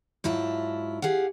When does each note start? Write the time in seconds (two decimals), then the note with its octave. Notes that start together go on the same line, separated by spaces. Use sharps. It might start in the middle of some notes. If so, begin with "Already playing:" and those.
0.24 G#2 F#3 E4 F4 A5
1.02 G4 G#4 F5 F#5